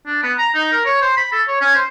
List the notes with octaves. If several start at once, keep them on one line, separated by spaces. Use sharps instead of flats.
D4
B3
A#5
D#4
A#4
C#5
C5
B5
A4
C#5
C#4
C5